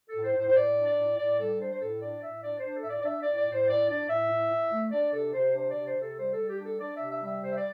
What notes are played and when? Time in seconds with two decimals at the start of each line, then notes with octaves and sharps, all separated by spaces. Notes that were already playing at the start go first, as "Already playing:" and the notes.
0.08 A4
0.14 A2
0.23 C5
0.34 A2 C5
0.49 C5
0.55 A2 D5
0.76 D4
0.86 D5
0.96 A2
1.17 A2 D5
1.38 G3 A4
1.59 D4 C5
1.70 C5
1.79 A2 A4
2.00 D4 D5
2.21 A2 E5
2.42 D4 D5
2.58 C5
2.63 D4
2.74 A4
2.82 A2 E5
2.89 D5
3.00 D5
3.04 D4 E5
3.21 A2 D5
3.36 D5
3.47 A2 C5
3.67 A2 D5
3.88 D4 D5
4.08 A2 E5
4.29 A2
4.50 A2
4.71 A3
4.91 D4 D5
5.13 C3 A4
5.33 C3 C5
5.54 D4 C5
5.69 D5
5.76 C3
5.85 C5
5.96 C3 A4
6.17 G3 C5
6.32 G3 A4
6.48 G4
6.58 D4
6.64 A4
6.78 D4 D5
6.95 E5
7.00 C3
7.11 E5
7.21 G3 E5
7.41 C3 C5
7.50 E5
7.57 D5